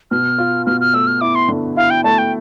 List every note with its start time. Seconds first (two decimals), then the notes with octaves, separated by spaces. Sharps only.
0.11 B2 F6
0.38 F4
0.66 B2 F6
0.81 F6
0.94 A3 E6
1.07 F6
1.21 E4 D6
1.35 C6
1.48 D3
1.76 E4 F5
1.90 G5
2.04 A3 A5
2.18 G5